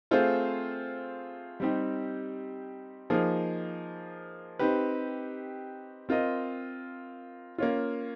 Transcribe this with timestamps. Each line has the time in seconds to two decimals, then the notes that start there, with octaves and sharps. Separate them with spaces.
0.11 A3 C4 F4 G#4 C5
1.60 G3 C4 D#4 G4
3.10 F3 A#3 D#4 G#4
4.59 C4 D#4 G4 B4
6.09 C4 F4 A#4 D#5
7.58 A#3 C#4 F4